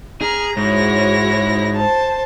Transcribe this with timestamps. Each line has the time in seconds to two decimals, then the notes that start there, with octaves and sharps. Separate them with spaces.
0.21 G#4 A#5 F6
0.57 G#2 E4 F#4 G#4 C#5 A#6
1.76 C5 A5